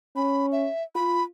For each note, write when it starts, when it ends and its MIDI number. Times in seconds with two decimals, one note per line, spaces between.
0.16 0.67 61
0.16 0.46 83
0.52 0.83 76
0.95 1.23 65
0.95 1.23 83